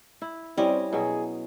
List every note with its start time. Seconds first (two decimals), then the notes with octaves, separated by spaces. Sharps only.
0.22 E4
0.58 G3 C4 C#4 E4 D#5
0.93 B2 F#3 G#4